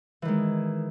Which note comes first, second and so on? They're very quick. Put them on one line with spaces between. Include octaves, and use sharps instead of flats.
E3 D#3 G#3